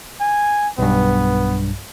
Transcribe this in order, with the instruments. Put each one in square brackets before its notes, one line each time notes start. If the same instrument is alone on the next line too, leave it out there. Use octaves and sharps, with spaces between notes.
[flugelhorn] G#5
[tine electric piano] B1 G2 [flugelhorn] B3